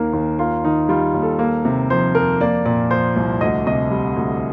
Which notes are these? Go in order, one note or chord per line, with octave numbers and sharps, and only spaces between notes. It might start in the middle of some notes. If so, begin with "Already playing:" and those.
Already playing: D#2 D#3 A#3 A#4
D#2
A#3 F4
D#3 D#4
G3 F4
D#2
A4
A#3
C3
F3 C5
F2 A#4
A#3 D5
A#2 D5
F3 C5
C2
D2 D#5
C3 D#5
G3
D2